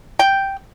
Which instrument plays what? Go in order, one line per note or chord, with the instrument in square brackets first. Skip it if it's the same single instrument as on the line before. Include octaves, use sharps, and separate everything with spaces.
[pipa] G5